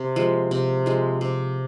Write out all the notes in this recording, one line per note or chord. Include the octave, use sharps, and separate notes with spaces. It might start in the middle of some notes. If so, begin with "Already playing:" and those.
Already playing: C3
F3 G#3
C3
F3 G#3
C3